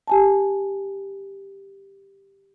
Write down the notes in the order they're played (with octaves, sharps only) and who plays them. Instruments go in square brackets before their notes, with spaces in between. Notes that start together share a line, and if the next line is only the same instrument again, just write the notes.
[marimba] G4 G#5 A5